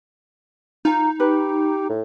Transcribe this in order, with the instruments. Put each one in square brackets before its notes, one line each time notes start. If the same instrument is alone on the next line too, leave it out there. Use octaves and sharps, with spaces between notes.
[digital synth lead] D#4 [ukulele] F4 A#5
[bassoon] G4 [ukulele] B4
[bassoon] A2